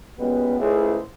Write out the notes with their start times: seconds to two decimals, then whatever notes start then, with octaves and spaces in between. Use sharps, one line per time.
0.19 F#2 A#2 G3 G#3 B3
0.59 C#2 A2 C#3 E4 G#4 C5